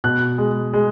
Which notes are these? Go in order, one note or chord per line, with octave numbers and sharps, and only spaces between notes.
B2 F#6
G#3
G#3